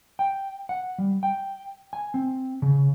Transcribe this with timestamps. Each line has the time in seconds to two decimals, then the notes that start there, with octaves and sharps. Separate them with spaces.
0.19 G5
0.69 F#5
0.98 G3
1.23 G5
1.93 G#5
2.14 C4
2.62 C#3